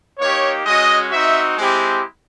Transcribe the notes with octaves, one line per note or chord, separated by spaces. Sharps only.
A#3 D#4 G4 C#5
G#3 C#4 F#4 D#5
C4 D#4 F#4 E5
G#3 C4 E4 G4